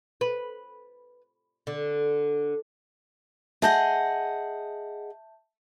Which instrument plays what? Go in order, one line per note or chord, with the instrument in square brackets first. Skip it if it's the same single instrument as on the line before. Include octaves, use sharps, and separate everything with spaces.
[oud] B4
D3
[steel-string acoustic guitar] G#4 D#5 F#5 [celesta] E5 A5 G6